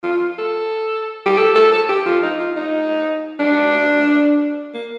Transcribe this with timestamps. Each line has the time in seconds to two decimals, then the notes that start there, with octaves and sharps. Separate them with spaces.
0.03 F4
0.38 A4
1.26 G4
1.38 A4
1.55 A4
1.72 A4
1.89 G4
2.05 F4
2.22 D#4
2.39 F4
2.56 D#4
3.39 D4
4.74 A#3